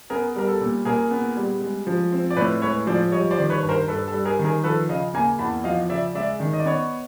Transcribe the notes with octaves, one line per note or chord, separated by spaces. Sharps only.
B3 G#4 A#4
G3 A#4
A4
A#2
A#2 G#4 A#4
B3
G3
G#3
F3
C4
D5
A2 B4 C#5
G#3 B4 C#5
F3 C5 D5
G3 C#5 D#5
C5 D5
D#3
B4 C#5
G2
A#4 C5
G2 A4 B4
A4
G3
G#4 A#4
D#3
G#4 A#4
F3 A4 B4
C#3 D#5 F5
A#3 G#5 A#5
E2 A5 B5
F3 D#5 F5
C#3 D5 E5
G#3 D5 E5
D#3
D#5
D5
B3 C#5 D#5